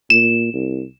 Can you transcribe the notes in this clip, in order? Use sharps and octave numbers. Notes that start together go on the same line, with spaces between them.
A#2 E7
C2